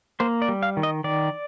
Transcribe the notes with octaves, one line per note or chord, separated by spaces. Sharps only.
A#3 C5
D5
G3
F5
D#3
D#5
D#3 D5